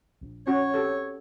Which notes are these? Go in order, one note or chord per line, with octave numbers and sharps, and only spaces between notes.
A#1
C#4 F#4 C#5
G4 A4